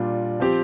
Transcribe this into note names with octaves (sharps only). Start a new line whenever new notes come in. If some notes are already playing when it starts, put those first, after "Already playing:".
Already playing: A#2 G3 D4 F4
F3 C4 G4